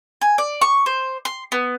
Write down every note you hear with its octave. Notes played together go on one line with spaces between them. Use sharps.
G#5
D5
C#6
C5
C6
B3